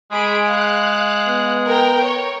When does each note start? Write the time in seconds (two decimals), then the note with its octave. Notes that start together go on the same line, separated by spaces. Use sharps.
0.12 G#3 G#4 B5 D7
0.46 F5 F#6
1.28 B3
1.66 A#4 G5
2.02 C#5